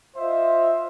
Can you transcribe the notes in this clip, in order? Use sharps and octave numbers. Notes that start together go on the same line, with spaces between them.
F4 C5 D#5 E5